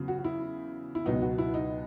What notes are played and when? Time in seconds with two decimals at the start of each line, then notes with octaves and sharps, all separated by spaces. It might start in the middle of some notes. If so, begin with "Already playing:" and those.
Already playing: E2 C#3 F#3
0.08 F#4
0.18 F#4
0.24 E4
0.95 E4
1.06 C#2 B2 F#3 B3 D#4
1.22 F#4
1.38 E4
1.54 D#4